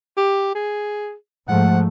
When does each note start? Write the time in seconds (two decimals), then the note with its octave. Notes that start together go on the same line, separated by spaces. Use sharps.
0.17 G4
0.55 G#4
1.48 G#2 F3 A3 F#5